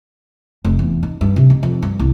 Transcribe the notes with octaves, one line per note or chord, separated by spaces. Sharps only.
F1
E2
D#4
G2
C3
D#4
F2
G2
C2